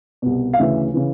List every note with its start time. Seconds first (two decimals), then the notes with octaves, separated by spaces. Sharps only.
0.22 C2 B2
0.54 F5
0.58 D2 C#3 E3 E5
0.94 C#3 E3